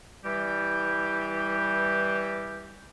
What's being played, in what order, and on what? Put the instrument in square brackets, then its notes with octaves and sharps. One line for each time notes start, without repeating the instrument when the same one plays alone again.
[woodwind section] E3 G3 G4